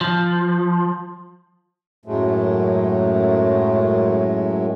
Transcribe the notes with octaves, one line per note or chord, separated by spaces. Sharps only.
F3
F#2 A2 F#3 G#3 A3